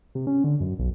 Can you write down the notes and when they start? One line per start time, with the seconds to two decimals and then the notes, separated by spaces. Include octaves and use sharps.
0.15 C3
0.27 C#4
0.44 D3
0.60 F#2
0.79 B1